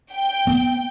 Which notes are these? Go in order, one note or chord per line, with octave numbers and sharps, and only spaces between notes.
G5
B3